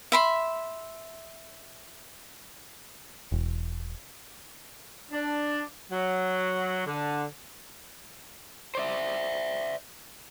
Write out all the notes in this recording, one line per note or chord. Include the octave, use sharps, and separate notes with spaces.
E5 B5 C6
E1
D4
F#3
D3
C5 D5 E5